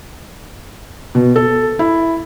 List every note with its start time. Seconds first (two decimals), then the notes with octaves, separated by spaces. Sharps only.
1.15 B2
1.36 A4
1.79 E4